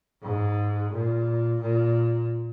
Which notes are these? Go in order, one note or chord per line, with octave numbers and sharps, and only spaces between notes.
G#2
A#2
A#2